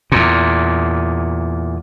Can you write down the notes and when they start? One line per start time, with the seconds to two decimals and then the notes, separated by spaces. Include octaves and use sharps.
0.12 E2 A#2